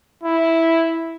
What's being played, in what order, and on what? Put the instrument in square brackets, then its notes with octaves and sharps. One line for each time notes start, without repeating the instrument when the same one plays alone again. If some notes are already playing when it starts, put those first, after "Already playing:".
[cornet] E4